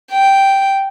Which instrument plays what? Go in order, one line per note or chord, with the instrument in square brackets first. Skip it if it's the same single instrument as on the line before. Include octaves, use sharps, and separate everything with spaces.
[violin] G5